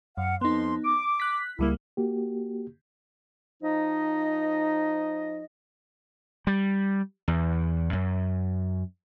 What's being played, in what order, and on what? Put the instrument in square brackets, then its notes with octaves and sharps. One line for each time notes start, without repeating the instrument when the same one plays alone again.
[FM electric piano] F#2 [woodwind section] F5 F#5
[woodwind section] F2 F3 C6 [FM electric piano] B3 D#4
[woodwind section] D6
[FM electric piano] F#6 B6
[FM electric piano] C#2 G3 A#3 [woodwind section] E4
[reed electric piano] A#3 F#4 G4
[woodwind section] F3 D#4 D#5
[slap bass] G3
E2
F#2